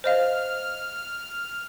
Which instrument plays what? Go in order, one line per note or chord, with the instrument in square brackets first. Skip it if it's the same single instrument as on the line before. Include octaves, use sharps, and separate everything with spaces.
[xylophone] C5 D#5 F5 [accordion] F6